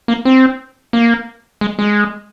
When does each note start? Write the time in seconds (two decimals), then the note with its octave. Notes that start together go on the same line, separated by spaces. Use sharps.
0.08 A#3
0.25 C4
0.93 A#3
1.61 G#3
1.79 G#3